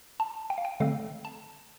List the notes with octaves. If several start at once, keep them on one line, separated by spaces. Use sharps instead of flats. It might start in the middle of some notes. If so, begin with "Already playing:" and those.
A5
G5
F5
G5
D3 A3 C4 F5
A5